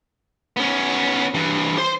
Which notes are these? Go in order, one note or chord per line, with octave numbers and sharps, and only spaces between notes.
B3 C#4
G2 E3
C5 C6